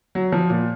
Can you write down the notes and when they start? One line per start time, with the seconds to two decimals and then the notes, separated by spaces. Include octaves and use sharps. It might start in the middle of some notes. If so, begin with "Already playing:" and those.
0.15 F#3
0.32 F3
0.50 A#2